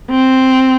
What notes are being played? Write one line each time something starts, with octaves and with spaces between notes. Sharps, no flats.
C4